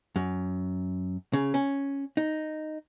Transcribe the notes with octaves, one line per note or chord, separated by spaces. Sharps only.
F#2
C#3
C#4
D#4